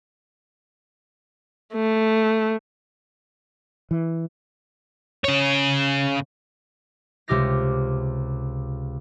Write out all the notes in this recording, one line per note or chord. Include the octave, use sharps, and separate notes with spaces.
A3
E3
C#3 C#5
C#2 C3 G4 D6 F6 A#6